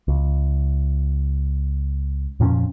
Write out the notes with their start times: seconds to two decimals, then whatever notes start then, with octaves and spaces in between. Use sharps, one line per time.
0.08 C#2
2.40 F2 A#2 F3 C#4